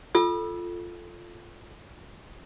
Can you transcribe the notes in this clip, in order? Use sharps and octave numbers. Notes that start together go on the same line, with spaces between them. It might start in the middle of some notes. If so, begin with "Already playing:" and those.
F4 A4 E6